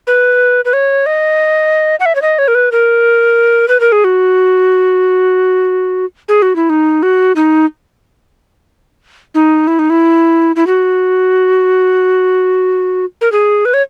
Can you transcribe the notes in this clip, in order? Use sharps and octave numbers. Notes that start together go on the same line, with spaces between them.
B4
B4
C#5
D#5
F#5
E5
C#5
D#5
C#5
A#4
B4
A#4
B4
A#4
G#4
F#4
G#4
F#4
E4
D#4
F#4
D#4
D#4
E4
D#4
E4
E4
F#4
A#4
G#4
B4
C#5